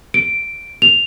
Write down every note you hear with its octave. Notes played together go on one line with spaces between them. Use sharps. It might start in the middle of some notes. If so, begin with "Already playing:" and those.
D7
F7